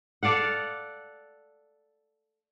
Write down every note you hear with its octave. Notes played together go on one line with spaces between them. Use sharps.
A4 D5 F5 F#5